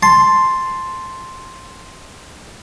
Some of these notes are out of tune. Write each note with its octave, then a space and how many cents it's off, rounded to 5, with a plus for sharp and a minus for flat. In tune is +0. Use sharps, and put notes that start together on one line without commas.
A5 +0 C6 +0